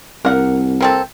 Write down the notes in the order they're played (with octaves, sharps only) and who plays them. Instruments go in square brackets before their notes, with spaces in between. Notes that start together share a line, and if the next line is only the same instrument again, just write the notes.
[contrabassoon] C2 [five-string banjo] A#4 F#5
[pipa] A#3 C4 A4